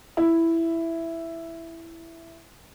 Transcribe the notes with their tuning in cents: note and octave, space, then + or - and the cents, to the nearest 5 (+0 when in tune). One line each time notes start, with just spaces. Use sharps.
E4 +5